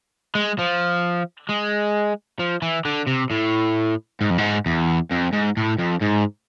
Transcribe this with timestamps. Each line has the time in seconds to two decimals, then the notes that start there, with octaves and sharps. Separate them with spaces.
0.35 G#3
0.59 F3
1.49 G#3
2.39 F3
2.62 E3
2.85 D3
3.07 C3
3.30 A2
4.21 G#2
4.30 F2
4.38 G#2
4.66 E2
5.11 F2
5.33 G#2
5.57 A2
5.78 F2
6.01 G#2